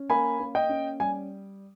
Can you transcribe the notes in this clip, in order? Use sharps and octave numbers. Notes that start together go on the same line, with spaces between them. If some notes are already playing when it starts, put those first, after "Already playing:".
Already playing: C#4
A#3 G#5 B5
A#3
D#5 G5
C#4
G3 G#5